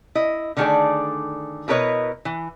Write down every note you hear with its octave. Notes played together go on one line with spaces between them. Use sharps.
E4 D#5
D3 D#3 A3 D#4 G#4 D5
B2 E4 A#4 B4 C#5 D#5
E3